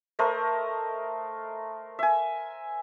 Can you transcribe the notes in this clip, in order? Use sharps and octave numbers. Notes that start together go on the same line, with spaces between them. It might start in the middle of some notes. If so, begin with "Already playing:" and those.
A3 A#4 C5 D#5
E5 G#5